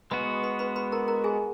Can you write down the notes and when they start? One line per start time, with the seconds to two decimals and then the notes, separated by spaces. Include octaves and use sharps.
0.11 G#3 B3 F#4 B4 B5
0.43 B4 B5
0.59 B4 B5
0.76 B4 B5
0.92 A#4 A#5
1.08 A#4 A#5
1.24 G#4 G#5